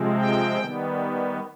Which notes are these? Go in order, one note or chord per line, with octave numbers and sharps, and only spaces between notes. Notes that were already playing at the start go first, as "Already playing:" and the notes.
Already playing: C3 F3 G#3 C4
G5
D#3 G3 B3